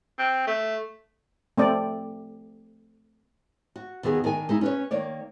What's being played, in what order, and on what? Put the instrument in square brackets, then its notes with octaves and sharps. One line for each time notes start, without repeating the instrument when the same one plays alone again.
[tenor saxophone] C4
A3
[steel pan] A3 C4 D5
[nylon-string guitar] F#4
D#2 D#3 B3 F#4 G#4
D#3 D4 A#4 G#5
G#3 D#4 E4
C#4 B4 C#5
D#3 A#3 C#5 D5